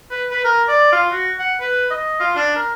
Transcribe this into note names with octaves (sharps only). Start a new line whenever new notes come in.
B4
B4
A#4
D5
F4
F#4
F#5
B4
D#5
F4
D4
A#4